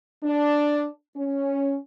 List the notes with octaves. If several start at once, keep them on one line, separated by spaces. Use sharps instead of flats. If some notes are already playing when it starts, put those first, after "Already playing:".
D4
C#4